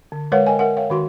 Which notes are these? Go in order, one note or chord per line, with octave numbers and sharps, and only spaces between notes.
D3
G#3 A#4 B4 C#5 F5 F#5
A#4 D#5 G5 G#5
A#4 E5 F#5
C#5 F5 G5
D#3 F#4 C6